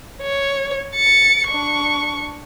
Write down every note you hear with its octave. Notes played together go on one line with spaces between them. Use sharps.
C#5
A6 C#7
D4 C#6